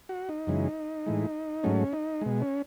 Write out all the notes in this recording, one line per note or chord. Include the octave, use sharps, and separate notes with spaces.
F#4
D#4
F#2 C#3 E3 G#3
A2 E3 G#3
G#2 F#3 A3 C#4
D#4
B2 G#3
C#4